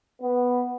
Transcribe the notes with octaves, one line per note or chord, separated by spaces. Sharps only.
B3